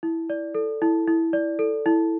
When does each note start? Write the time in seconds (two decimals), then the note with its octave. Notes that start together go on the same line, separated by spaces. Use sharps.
0.03 E4
0.30 D5
0.55 A4
0.82 E4
1.08 E4
1.33 D5
1.59 A4
1.86 E4